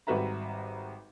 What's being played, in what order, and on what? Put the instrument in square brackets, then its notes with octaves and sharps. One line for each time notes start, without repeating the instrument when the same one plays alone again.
[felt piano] G#1 G3 F#4 B4 E5 A#5